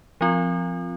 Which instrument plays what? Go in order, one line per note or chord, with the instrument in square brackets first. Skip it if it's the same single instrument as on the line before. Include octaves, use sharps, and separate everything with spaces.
[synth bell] F3 C4 F4